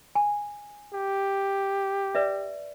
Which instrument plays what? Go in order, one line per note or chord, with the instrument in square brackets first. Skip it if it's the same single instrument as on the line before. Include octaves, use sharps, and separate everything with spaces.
[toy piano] G#5
[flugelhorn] G4
[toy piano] B4 D5 E5